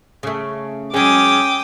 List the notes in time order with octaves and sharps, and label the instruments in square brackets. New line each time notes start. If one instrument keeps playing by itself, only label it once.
[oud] C#3 A3
[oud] F#3 G#3 [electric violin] C#4 [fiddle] G5 D#6 [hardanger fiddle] D6